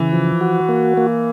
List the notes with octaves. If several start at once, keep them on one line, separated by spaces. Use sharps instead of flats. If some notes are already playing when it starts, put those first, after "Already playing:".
Already playing: C#3 E3
F3
F#4
A#3
A#3